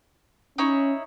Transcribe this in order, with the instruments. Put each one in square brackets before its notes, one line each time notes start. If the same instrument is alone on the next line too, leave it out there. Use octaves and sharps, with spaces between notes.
[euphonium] C#4 [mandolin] D#4 E4 C#5